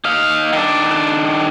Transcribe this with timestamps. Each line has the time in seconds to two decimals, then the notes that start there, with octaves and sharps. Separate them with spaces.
0.05 D#4 F5
0.53 D#3 D4